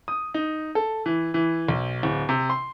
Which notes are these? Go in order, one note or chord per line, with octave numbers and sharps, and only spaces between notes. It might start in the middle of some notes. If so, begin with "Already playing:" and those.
D#6
D#4
A4
E3
E3
B1
D1
C3
C6